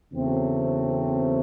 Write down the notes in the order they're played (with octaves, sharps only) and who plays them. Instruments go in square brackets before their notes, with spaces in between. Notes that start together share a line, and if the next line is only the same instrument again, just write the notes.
[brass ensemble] E2 C#3 F#3 A3 C4